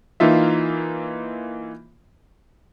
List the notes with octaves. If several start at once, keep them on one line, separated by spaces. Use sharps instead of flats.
E3 A#3 D#4 F4 E5